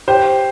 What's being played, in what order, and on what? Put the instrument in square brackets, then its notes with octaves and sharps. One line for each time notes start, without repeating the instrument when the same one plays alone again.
[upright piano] G4 C5